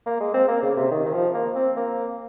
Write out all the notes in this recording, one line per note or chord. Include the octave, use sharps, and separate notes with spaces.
A#3
G#3
C4
A#3
C#3
C3
D#3
D#3
F3
A#3
C4
A#3